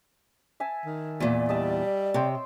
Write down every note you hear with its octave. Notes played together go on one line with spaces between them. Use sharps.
E5 G#5 A5
D#3
E2 A#2 D5
G3 D#5 E5 A5
C3 C#5 G5 C6